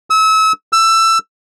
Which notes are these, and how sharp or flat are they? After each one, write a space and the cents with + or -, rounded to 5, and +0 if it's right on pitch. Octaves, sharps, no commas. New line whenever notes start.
E6 -35
E6 +15